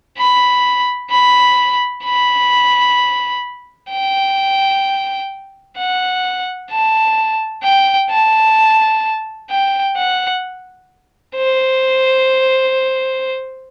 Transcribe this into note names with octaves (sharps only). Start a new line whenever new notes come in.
B5
B5
B5
G5
F#5
A5
G5
A5
G5
F#5
C5